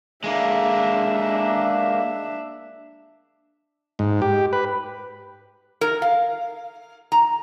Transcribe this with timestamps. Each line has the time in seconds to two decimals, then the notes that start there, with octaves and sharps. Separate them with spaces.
0.24 G#3 A#3 D4 E5
3.99 G#2
4.22 G4
4.53 B4
5.81 A#4
6.02 F5
7.12 A#5